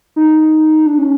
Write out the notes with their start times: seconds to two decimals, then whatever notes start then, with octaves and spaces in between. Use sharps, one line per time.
0.16 D#4
0.86 D4
0.98 C#4